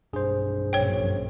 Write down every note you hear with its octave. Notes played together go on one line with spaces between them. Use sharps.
B1 G2 D4 G#4 C5
A#1 F#2 C#5 G5